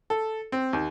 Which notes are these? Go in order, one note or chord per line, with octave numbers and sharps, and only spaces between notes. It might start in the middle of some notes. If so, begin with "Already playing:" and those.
A4
C4
D#2